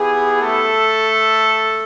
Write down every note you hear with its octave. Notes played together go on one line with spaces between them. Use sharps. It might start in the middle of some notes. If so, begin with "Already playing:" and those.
Already playing: B3 E4 G4 G#4
A3 A4